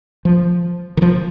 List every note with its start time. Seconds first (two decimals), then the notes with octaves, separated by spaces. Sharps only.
0.25 F3
0.97 D#3
1.02 F3